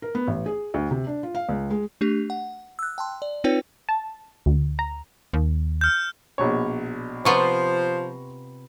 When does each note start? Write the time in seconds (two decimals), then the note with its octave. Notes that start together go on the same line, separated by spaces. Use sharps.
0.02 A#4
0.15 B3
0.27 A1
0.46 G#4
0.74 D2
0.91 C3
1.07 D4
1.23 F4
1.35 F5
1.49 C#2
1.71 G#3
2.01 A3 D4 G4
2.30 F#5
2.79 E6 F#6
2.98 G5 A5 C6
3.22 D5
3.44 C4 D#4 F4 B4 C#5 G5
3.89 A5
4.46 D2
4.79 A#5
5.33 D#2
5.81 F6 G6
6.38 A#1 B2 C#5
7.25 C3 F3 B3 F4 C5 A#5 C6 C#6